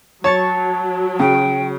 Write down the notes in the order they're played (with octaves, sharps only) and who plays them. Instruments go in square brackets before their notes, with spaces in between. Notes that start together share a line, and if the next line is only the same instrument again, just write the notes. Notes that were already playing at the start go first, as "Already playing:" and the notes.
[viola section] F#3 [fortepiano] C#5 [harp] A5 C#6 A6
[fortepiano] C#3 [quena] G5